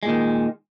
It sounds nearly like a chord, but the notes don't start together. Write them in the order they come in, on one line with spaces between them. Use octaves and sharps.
G#3 A#2 D#3